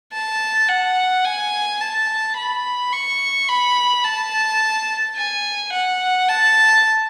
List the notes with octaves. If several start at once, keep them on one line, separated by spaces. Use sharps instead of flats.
A5
F#5
G#5
A5
B5
C#6
B5
A5
G#5
F#5
A5